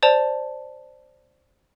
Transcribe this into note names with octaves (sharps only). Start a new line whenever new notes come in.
C5 D5 A5 F7